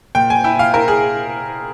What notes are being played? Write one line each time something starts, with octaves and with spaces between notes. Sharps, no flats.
A#2 G5
G#5
E4 G5
F5
E4 A#4
G#4